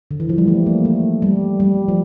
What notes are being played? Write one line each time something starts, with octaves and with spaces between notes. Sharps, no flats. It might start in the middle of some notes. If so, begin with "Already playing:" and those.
D3
E3
F3
G3
A3
A#3
A3
G3
G3
F3